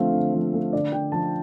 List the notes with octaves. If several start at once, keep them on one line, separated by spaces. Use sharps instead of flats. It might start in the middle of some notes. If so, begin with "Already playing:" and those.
Already playing: D3 F3 A3 C4 F5
D3
F3
A3
D3 D5
D3 G5
F3 A5